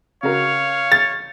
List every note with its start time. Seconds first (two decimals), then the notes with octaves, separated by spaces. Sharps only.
0.23 C#3 F#4 A#4 C#5 F5
0.92 A6